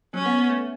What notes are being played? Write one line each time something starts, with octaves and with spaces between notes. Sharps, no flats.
F#3 C#4
B3
B3
A3